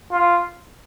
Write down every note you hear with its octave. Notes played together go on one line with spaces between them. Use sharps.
F4